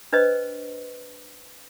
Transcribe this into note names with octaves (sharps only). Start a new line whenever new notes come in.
D4 B4 C5 D#5